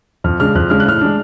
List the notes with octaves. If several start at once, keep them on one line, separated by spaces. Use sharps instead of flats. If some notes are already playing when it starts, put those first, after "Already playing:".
F2 F6
C#3 G#3 D4 F6
F2 F#6
C#3 G#3 D4 F6
F#6
A2 F6
G#3 D4